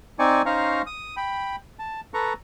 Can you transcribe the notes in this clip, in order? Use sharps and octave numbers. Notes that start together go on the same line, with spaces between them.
C4 D#4 D5 G#5 C#6
C#4 D#4 C5 F5 A#5 C#6
D#6
G5 B5
A5
A4 B4 A#5 C#6